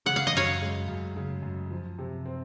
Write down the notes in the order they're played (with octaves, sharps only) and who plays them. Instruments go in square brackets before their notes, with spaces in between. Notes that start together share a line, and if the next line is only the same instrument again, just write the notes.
[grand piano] C#3 [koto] F#5
[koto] F5
D#5
[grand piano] F#2 [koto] C#5 F5
[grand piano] G#3
F#2
C#3
F#2
F3
C3
C4